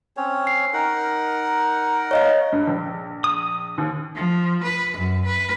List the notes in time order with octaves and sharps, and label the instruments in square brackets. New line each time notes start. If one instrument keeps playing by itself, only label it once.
[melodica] C4 C#4 C#5
[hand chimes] C7
[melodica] D#4 A#4 F#5
[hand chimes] C#5 D#5 F5
[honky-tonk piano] G2
A#1
[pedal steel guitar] D#6
[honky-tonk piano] D#2
[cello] F3
B4
F#2
B4